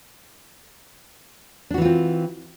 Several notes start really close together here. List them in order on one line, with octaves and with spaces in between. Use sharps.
D4 F#4 E3 F4 C4